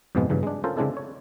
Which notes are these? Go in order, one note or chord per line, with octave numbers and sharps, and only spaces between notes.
F2 G#2 B2 F3 G#3 B3
G2 C#3 E3 F#3
G#3 D4
C#4 F4 A4 A#4 C5
C#3 G#3 C4 D4 E4 A4
C#5